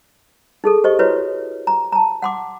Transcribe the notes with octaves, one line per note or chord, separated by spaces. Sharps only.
D#4 G#4 A4
G4 C5 D#5 C#6
E4 F#4 B4 C#5
A#5
A5 A#5
F#5 C6 D6